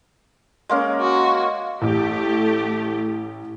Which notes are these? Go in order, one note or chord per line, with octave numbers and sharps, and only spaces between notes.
G#3 A#3 C#4
F#4
A1 A3 G4